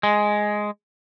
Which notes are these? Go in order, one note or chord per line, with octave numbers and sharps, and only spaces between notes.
G#3